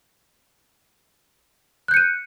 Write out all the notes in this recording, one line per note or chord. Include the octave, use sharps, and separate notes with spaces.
F#6 G6 C#7 D#7